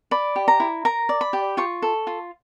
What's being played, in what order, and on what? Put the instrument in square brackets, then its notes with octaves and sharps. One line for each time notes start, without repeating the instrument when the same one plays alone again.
[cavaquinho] D5 B5
G4
A#5
E4
A#4 A#5
D5
B5
G4
F4 C#6
A4
F4